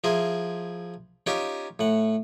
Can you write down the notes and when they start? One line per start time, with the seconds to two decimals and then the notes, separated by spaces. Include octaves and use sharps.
0.04 F3 E4 G#4 A#4 C6
1.26 C#4 D#4 F4 G4 A#4 G5
1.79 A2 F#5